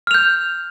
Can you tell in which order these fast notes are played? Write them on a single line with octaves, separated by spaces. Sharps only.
F6 F7 G6